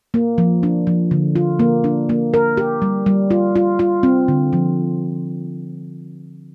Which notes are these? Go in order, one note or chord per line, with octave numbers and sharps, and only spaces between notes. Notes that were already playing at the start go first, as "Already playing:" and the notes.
A#3
F3
D4
F3
D3
F4
A#3
D4
A#3
A#4
G4
G3
G3
F4
F4
F4
C4
D3
F3